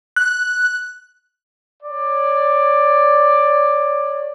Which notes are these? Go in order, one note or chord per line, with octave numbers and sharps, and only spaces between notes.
F#6
C#5 D5